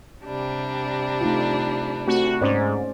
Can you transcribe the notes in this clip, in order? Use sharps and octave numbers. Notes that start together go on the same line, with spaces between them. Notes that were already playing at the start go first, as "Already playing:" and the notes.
C3 G3 D4
A3 D#4 F4
A3 C4 F#4
G#2 C#4 C5 D5